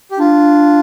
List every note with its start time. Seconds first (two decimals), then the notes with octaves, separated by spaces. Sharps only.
0.11 G4
0.18 D4 F4